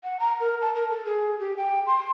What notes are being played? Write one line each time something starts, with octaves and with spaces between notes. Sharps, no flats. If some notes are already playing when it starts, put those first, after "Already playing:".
F#5
A#5
A#4
A5
A#4
A4
G#4
G4
G5
C6